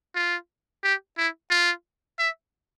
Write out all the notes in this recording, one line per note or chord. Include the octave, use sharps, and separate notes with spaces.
F4
G4
E4
F4
E5